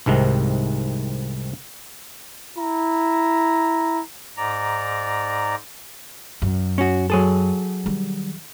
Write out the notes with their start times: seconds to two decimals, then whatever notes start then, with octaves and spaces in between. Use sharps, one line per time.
0.06 C2 G#2 C3 D#3
2.57 E4 A#5
4.37 G#2 D5 A#5
6.42 F#2
6.78 C#4 F#4
7.10 F#3 G#4 A4
7.86 D#3 G3